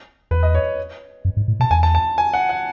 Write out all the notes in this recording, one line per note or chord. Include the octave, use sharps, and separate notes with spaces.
E2 B4
D#5
C#5
F#2
G#2
A2
B2 A5
E2 G#5
A5
A5
G#5
F#5
F#5